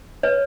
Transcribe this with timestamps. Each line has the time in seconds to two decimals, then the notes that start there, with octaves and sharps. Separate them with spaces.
0.23 B4 C#5